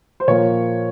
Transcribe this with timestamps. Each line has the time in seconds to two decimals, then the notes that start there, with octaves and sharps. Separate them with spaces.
0.20 C5
0.28 A#2 F3 A#3 C#5